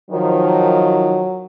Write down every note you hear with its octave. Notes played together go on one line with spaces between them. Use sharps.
D#3 F3 F#3